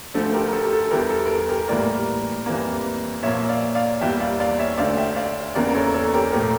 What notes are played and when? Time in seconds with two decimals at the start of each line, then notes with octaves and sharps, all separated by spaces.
0.14 D2 D3 F3 A3 A4
0.33 G4 A#4
0.47 A#4
0.53 A4
0.64 G4
0.73 A4
0.91 E2 E3 G3 G4 A#4
1.10 A4
1.26 A#4
1.30 A4
1.49 G4 A#4
1.68 A2 E3 G3 A#3 A#4 D5
2.46 F2 E3 G3 A#3
3.23 A#2 F3 A#3 C#5 E5
3.49 D5 F5
3.75 D5 F5
4.01 E2 E3 G3 A#3 E5 G5
4.20 D5 F5
4.40 D5 F5
4.59 C#5 E5
4.78 D2 D3 A3 D5 F5
4.97 E5 G5
5.16 D5 F5
5.55 E2 C#3 E3 A#3 A#4 D5
5.69 A#4
5.75 A4 C#5
5.94 A4 C#5
6.14 G4 A#4
6.32 A#2 F3 A3 G4 A#4